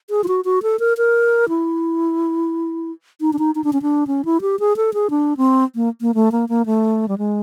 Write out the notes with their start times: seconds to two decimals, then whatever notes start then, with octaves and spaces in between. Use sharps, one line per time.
0.10 G#4
0.24 F4
0.28 F#4
0.45 F#4
0.63 A4
0.79 A#4
0.97 A#4
1.49 E4
3.21 D#4
3.33 D4
3.39 D#4
3.55 D#4
3.64 D4
3.73 C#4
3.82 D4
4.07 C#4
4.25 E4
4.41 G4
4.59 G#4
4.77 A4
4.94 G#4
5.10 D4
5.37 C4
5.75 A#3
6.01 A#3
6.14 A3
6.32 A#3
6.49 A#3
6.66 A3
7.08 G3
7.18 G#3